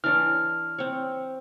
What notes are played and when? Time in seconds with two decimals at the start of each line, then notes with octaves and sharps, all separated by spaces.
0.04 E3 D4 C#5 F6
0.78 C4 C#5